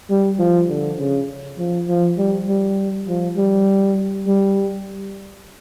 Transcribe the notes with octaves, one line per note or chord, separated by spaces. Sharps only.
G3
F3
D3
C#3
F3
F3
G3
G3
F3
G3
G3